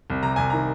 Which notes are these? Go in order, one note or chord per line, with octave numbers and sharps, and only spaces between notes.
C2
C3 A#5
C2 G#5
D#3 A#5